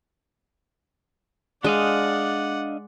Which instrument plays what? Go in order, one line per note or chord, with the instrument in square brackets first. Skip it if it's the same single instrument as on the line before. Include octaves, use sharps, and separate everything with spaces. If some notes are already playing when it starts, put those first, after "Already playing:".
[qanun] G#3 [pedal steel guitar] D4 D#5 F5 [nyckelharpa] D5 F#5